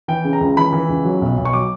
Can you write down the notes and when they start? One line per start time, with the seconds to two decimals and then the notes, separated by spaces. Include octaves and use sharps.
0.08 E3 G5
0.25 C#3
0.33 A#5
0.41 C#2
0.57 E3 B5
0.73 E3
0.89 C#2
1.05 F#3
1.22 B1
1.38 B1
1.45 C#6
1.53 F#3 D6